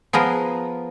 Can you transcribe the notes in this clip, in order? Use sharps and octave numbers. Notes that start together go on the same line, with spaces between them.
F3 B3 G#4 A#4